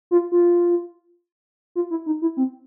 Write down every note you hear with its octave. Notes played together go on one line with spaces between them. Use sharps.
F4
F4
F4
E4
D#4
E4
C4